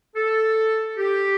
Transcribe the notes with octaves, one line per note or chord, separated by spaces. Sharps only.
A4
G4